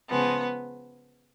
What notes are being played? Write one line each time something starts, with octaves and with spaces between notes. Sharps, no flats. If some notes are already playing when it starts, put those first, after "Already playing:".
C#3 F3 G#3 B3